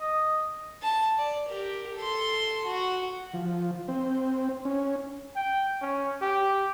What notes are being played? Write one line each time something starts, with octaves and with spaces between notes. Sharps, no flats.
D#5
A5
D5
G4 A#4
A4 C6
F#4
F3
C4
C#4
G5
C#4
G4